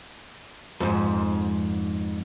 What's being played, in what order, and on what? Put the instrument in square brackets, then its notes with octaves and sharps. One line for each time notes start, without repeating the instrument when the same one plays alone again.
[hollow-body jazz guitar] F2 G#2